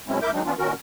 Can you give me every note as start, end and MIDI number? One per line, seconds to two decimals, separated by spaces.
0.08 0.19 47
0.08 0.19 54
0.08 0.19 56
0.08 0.19 60
0.08 0.19 61
0.08 0.19 64
0.22 0.31 38
0.22 0.31 64
0.22 0.31 70
0.22 0.31 76
0.22 0.31 86
0.22 0.31 91
0.33 0.42 51
0.33 0.42 54
0.33 0.42 56
0.33 0.42 60
0.33 0.42 62
0.33 0.42 63
0.45 0.54 52
0.45 0.54 59
0.45 0.54 61
0.45 0.54 62
0.45 0.54 65
0.58 0.73 46
0.58 0.73 51
0.58 0.73 61
0.58 0.73 66
0.58 0.73 70